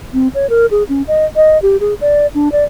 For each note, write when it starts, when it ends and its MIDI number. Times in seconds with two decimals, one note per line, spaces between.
0.14 0.28 60
0.35 0.49 73
0.50 0.66 70
0.71 0.83 68
0.89 1.02 61
1.08 1.25 75
1.36 1.60 75
1.62 1.77 67
1.80 1.94 68
2.01 2.27 74
2.35 2.52 62
2.52 2.64 74